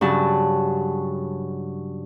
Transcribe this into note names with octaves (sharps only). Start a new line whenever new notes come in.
G2 C#3 F#3 A5